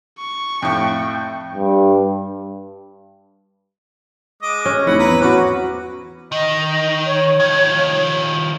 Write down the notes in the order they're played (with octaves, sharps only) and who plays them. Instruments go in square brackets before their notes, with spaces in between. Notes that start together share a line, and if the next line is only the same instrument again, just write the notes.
[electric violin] C#6
[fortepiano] F2 A2 [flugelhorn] G5
[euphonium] G2
[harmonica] G#3 D#5 D6
[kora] C#4
[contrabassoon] F1 [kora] E4 [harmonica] F#5
[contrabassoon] E2 [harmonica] B4 A#5 B5
[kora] C#4 F#4 [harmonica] B4 D6
[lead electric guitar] D#3 [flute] D#5
[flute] C#5
[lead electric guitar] D#3 F3